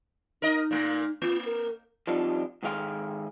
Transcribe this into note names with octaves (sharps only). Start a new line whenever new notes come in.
D#4 A#4 D#5
A#2 A3
A#3 F4
A#4
F3 G3 C4 D4 D#4 F4
G#2 D#3 G#4 F5 G5 C6